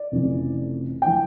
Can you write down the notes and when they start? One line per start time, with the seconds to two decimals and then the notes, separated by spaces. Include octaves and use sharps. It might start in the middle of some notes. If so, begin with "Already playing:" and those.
Already playing: D5
0.12 F1 F2 C#3 E3
1.02 E3 G5